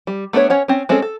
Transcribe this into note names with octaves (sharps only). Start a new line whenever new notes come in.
G3
A3 B3 D4 B4 C#5
C#4 C#5 F#5
C4 C#4
G#3 C4 C#4 G#4 A4
A4